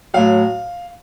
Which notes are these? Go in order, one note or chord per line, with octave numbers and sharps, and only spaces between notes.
A2 F#3 F5